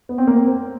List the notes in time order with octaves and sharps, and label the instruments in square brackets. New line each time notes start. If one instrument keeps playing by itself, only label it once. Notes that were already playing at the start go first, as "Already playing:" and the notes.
[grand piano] B3
C4
A#3
C4